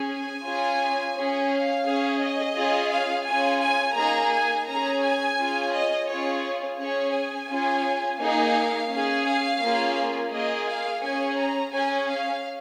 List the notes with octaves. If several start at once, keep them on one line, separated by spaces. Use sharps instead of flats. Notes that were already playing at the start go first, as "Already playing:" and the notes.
Already playing: C#4 G#4
G#5
C#4 F4 G#4
C#4 G#4
F5
C#4 G#4
D#5
C#4 F4 G#4
F5
C#4 F4 G#4 G#5
G#5
A#3 D#4 G#4 A#5
G#5
C#4 G#4 A#5
G#5
C#4 F4 G#4
D#5
C#4 F4 G#4 C#5
C#4 G#4 C#5
G#5
C#4 F4 G#4
A#3 D#4 G#4 F5
C#4 G#4
F5
A#3 C#4 F4 G#4
A#3 F4 G#4 D#5
F5
C#4 G#4 G#5
A#5
C#4 G#4 G#5
F5